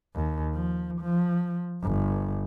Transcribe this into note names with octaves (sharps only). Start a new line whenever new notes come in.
D#2
F3
F3
G1